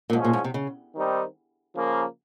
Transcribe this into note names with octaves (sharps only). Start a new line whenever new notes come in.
A#2
G#2 F3 G#3 C#4
A#2
G#2
C3
C#3
D#3 G3 C4 D#4
C#3 F3 A#3